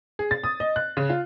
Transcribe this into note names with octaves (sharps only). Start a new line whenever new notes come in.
G#4
A6
D#6
D#5
F#6
C#3
F4